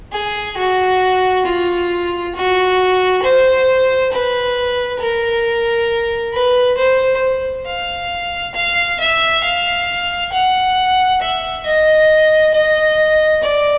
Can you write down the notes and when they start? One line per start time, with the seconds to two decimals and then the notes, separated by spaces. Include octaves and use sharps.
0.12 G#4
0.57 F#4
1.45 F4
2.35 F#4
3.23 C5
4.12 B4
5.00 A#4
6.33 B4
6.77 C5
7.67 F5
8.55 F5
9.00 E5
9.44 F5
10.32 F#5
11.21 E5
11.66 D#5
12.54 D#5
13.43 D5